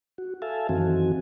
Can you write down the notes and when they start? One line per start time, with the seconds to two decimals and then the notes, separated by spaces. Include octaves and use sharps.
0.18 F#4
0.42 A4 E5 F5 G#5 A5
0.69 F#2 D#3 E3 C4 F#4 G#5